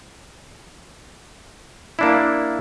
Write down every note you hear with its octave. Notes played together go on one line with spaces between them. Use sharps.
A#3 D4 E4